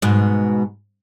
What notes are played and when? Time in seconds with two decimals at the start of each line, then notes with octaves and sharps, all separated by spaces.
0.02 G#2 B2